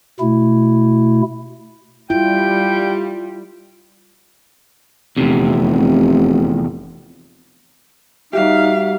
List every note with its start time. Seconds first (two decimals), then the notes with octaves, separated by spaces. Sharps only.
0.20 B2 A3 E4
2.10 G3 E4 F4 G5
5.17 F1 E2 C3
8.33 G3 D#4 F#4 G4 E5 F5